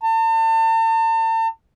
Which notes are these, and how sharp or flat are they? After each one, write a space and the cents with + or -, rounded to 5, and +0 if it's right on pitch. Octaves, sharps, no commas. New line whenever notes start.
A5 +40